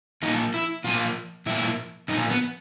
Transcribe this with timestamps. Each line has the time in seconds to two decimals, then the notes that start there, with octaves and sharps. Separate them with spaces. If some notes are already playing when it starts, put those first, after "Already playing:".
0.22 A#2 F3 A#3 D#4
0.54 E4
0.84 A#2 F3 A#3 F4
1.46 A#2 F3 A#3 E4
2.08 A#2 F3 A#3 D#4
2.30 B3